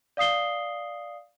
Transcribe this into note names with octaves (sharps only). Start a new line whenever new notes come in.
D5 F5 D#6 C7 G7